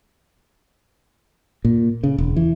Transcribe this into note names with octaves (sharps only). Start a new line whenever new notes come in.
A#2
C#3
E1
E3